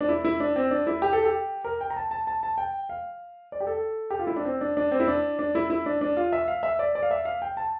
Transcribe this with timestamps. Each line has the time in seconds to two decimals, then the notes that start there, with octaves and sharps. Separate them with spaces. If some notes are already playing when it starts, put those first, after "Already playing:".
0.01 D4
0.09 E4
0.25 E4
0.40 D4
0.56 C4
0.71 D4
0.87 E4
1.02 G4
1.13 A4
1.25 G4
1.64 A#4
1.81 G5
1.90 A#5
1.96 A5
2.11 A5
2.27 A5
2.43 A5
2.58 G5
2.89 F5
3.52 D5
3.61 G4
3.67 A4
4.10 G4
4.19 F4
4.27 E4
4.36 D4
4.45 C4
4.61 D4
4.77 D4
4.92 C4
5.00 E4
5.07 D4
5.39 D4
5.55 E4
5.70 E4
5.86 D4
6.01 D4
6.17 F4
6.33 E5
6.48 F5
6.63 E5
6.79 D5
6.95 D5
7.03 F5
7.11 E5
7.25 F5
7.42 G5
7.57 A5